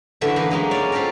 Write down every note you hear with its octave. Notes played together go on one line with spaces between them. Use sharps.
F#2 D3 E3 A3 E5
A#3 D#4 B4
F#3 G#3 A#3 D#4 G#5 C6
C#4 C#5 D5
C4 F4 G4 A4 A#4